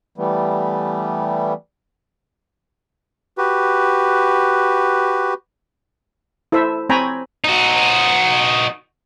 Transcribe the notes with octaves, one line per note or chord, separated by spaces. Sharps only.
E3 G3 A3 B3
F#4 G4 B4
E4 A4 C5 E5
C4 C#5 G5 G#5 A#5 B5
D#4 F#4